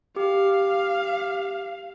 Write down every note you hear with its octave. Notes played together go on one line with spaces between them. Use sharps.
G4 F5